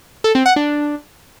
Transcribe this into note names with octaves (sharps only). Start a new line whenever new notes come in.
A4
C4
F#5
D4